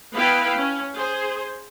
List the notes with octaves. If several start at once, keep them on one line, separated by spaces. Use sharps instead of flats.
B3 E4 B4 F5 G5
C#4
G#4 C5